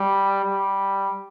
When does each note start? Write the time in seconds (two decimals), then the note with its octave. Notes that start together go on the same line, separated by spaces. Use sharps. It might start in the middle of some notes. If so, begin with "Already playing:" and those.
Already playing: G3
0.44 G3